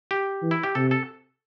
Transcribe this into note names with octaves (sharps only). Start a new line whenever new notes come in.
G4
E3
E4
G4
C3 A4
A4